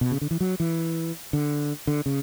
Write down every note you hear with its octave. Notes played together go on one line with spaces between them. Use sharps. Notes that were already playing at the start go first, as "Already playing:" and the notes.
B2
C#3
D3
E3
F#3
E3
D3
D3
C#3